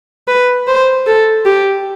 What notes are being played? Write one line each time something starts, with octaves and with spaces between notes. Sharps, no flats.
B4
C5
A4
G4